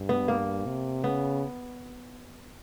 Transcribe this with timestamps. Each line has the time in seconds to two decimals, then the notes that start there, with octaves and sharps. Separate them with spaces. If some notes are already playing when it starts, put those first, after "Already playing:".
Already playing: G2
0.09 B3
0.28 A#3
0.66 C3
1.04 C#3 B3